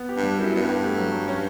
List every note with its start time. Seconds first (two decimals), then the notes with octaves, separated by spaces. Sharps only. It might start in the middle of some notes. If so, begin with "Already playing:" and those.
Already playing: B3
0.09 G4
0.16 G2
0.23 G3
0.39 F#2 E4
0.54 F#2 B3
0.61 G2
0.69 G4
0.84 A3
0.98 F#3
1.13 F#3
1.28 C#4